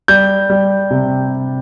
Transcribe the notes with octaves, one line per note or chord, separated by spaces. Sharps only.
G3 G6
G3
C3